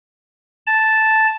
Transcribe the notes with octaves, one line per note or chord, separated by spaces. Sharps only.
A5